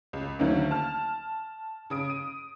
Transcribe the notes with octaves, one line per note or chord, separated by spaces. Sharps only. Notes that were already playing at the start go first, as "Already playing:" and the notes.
C#2
D2 D3 D#3 F#3 A#3 C#4
A5 F6
C#3 D#6 D7
D#7